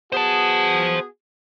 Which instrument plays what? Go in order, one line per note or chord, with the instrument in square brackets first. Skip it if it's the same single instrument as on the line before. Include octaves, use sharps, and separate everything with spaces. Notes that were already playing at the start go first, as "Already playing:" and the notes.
[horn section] B3 F#4 G#4 [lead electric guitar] C5 A5